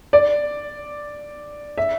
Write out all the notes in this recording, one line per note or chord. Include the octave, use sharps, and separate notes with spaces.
D5
E5